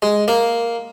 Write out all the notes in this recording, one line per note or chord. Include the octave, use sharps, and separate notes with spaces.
G#3
A#3